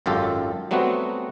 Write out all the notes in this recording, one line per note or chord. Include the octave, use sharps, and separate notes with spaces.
G#1 F#2 F4 G4 A4
F#3 G3 A3 B3 C4 F#4